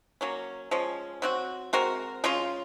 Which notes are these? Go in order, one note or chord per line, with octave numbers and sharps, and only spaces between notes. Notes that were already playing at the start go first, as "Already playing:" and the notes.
F#3 A#3 C#4
F3 G#3 C#4
F#3 C4 F#4
G#3 C4 F#4 A#4
C#3 G#3 C#4 F4